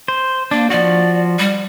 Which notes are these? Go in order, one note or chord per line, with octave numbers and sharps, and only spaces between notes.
C5
A#3 D4
F3 F#4 D5
G3